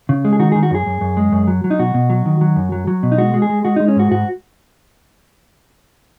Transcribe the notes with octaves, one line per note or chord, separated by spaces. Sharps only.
C#3
G#3
G#4
D#3 F#4
G#4
D#3
F#4
F#2 G#4
F#2
F#2
G#3
F#2
F#3
F#3
D#4
B2 F#4
B2
F#3
D#3
F#3
F#2
F#3
F#3
B2
D#4
G#3 F#4
G#3
G#4
G#3
G#3 F#4
D#4
G#3
C#4
G#2 F#4
G#2 F#4